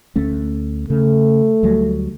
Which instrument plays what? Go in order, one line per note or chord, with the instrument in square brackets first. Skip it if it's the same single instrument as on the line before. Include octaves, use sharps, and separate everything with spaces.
[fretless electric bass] D2 A3 C#4
[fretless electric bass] C#3 [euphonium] A3
[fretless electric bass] D2 F#3 G3